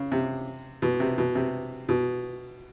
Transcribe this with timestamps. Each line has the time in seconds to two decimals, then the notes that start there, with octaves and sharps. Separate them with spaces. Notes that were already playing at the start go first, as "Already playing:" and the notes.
Already playing: C#3
0.12 C3
0.82 B2
1.00 C3
1.18 B2
1.35 C3
1.89 B2